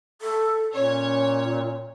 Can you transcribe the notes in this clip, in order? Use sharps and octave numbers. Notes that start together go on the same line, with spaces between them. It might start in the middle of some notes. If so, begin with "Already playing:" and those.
A4
A#2 C#4 C#5